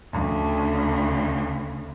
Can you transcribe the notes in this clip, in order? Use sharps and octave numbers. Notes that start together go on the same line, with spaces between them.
D2 C#3